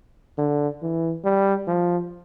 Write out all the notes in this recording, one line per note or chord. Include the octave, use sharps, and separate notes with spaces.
D3
E3
G3
F3